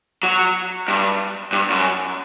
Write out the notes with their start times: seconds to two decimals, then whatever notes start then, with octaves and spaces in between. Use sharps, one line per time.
0.23 F#3
0.88 G2
1.53 G2
1.70 F#2